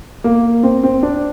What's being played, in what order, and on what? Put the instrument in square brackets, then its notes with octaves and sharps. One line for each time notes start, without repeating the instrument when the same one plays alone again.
[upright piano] A#3
C4
C4
D4